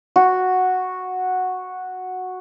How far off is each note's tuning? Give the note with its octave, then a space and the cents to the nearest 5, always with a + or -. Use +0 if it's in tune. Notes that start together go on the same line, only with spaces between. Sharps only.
F#4 -5